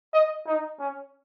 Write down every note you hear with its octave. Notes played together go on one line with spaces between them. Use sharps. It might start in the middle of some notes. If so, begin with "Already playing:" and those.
D#5
D#4
C#4